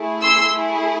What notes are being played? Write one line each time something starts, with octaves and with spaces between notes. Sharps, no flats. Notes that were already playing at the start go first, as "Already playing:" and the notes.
Already playing: A3 E4 G#4
C6 E6
A3 E4 G#4